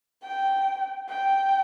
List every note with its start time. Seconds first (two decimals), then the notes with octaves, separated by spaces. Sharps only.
0.23 G5
1.09 G5